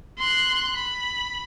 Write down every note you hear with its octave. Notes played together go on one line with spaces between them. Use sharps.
C6 F#6
B5